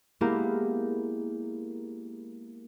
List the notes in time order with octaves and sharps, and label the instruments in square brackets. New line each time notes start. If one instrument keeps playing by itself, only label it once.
[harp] G#3 A#3 B3 E4 G4 A#4